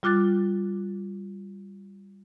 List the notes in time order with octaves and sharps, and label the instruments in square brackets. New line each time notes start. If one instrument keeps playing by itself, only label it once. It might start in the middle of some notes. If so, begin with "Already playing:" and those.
[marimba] G3 F4 D6 F#6 A6